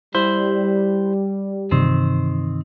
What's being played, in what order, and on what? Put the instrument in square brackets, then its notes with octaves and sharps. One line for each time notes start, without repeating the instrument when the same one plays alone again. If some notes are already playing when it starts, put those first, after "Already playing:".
[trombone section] G3 [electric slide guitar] E4 C5
[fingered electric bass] G2 C3 E3 [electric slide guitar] D#3 C4